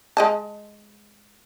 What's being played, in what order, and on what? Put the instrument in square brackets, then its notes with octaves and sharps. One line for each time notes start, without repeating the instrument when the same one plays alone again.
[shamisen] G#3 D#5 A5